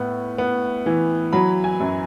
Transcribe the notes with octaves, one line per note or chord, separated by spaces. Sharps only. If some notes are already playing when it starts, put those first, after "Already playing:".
Already playing: A2 B3
B3
E3
F#3 B5
G#5
F#2